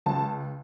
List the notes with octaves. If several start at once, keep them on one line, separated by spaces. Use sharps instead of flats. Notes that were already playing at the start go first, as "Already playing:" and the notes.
C#2 A5